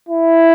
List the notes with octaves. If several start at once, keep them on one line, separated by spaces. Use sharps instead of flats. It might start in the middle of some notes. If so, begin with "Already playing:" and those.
E4